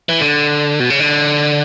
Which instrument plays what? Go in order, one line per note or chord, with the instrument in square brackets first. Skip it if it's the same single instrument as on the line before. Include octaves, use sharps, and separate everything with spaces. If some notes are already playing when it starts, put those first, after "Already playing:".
[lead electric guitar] E3
D3
B2
C#3
D3